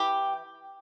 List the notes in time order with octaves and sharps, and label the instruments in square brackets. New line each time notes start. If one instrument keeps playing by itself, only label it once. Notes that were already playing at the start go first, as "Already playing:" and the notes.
Already playing: [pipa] E3 G4